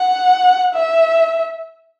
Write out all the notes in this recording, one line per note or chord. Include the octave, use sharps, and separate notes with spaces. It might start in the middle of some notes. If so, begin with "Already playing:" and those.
Already playing: F#5
E5